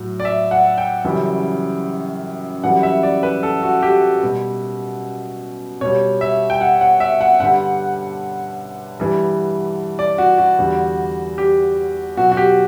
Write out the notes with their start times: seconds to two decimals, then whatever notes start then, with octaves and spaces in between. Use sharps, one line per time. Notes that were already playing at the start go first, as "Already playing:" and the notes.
Already playing: A2 F#3
0.20 D5
0.25 E5
0.51 F#5
0.78 G5
1.04 F#2 C#3 E3 G3
2.63 F#2 E3 G3 F#5
2.83 E5
3.03 D5
3.23 B4
3.43 A4
3.63 F#4
3.83 G4
4.23 B2 G3
5.81 B2 G3 C#5
6.21 E5
6.50 G5
6.61 F#5
6.81 F#5
7.00 E5
7.21 F#5
7.40 G2 D3 G3 F#5
9.00 G2 E3 G3
9.99 D5
10.18 F#4
10.38 F#4
10.59 E2 D3 G3
11.38 G4
12.17 B2 F#3 F#4
12.32 F#4
12.37 G4